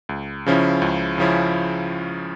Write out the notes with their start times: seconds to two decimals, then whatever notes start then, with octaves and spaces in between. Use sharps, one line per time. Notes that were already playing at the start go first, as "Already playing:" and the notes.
0.09 C#2
0.46 C#3 F3 C#4 E4
0.82 C#2
1.18 C#3 F3 C#4 E4